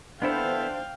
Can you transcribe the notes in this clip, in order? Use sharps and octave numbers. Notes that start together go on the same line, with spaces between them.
B3 D4 E4 A4 C5 F5 G5